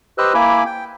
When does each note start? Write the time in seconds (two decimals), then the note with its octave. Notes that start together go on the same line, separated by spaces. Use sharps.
0.18 G4 B4 C5 D#5 E6 F#6
0.34 A#3 E4 G#5 B5 D6
0.66 G5